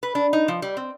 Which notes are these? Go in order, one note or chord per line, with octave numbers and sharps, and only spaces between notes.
B4
D4
D#4
F3
G3
C4